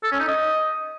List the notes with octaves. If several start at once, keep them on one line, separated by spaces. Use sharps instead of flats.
A4
C#4
D#4
D#5